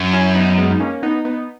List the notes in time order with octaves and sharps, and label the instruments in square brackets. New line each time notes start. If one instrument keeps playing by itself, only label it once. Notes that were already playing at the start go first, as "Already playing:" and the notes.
Already playing: [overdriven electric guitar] F#2
[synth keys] C#4 E4
B3 D#4
G#3 B3
D#4
A#3 C#4
B3 D#4
B3 D#4